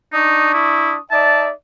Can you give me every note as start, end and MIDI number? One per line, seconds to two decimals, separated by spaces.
0.13 0.98 62
0.13 0.50 63
0.13 0.98 85
0.13 0.98 87
0.54 0.93 64
1.11 1.51 63
1.11 1.51 74
1.11 1.51 76
1.11 1.44 81